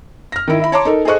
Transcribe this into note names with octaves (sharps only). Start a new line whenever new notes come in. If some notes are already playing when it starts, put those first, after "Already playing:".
F6 A#6
D#3 E4
E4 E5 B5
C#5 A5 A#5 C6 D6
D#4 A4 A#4
G#4 A4 C5 D#5 C#6 F#6